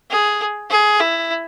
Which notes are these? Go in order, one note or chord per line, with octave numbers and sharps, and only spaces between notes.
G#4
G#4
E4